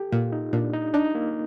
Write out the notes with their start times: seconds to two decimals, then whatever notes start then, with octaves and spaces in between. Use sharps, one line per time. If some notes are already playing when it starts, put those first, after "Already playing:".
Already playing: G4 A4
0.12 A#2 F4
0.32 D#4
0.53 A#2 D4
0.73 D#4
0.94 D4 D#4
1.15 A#3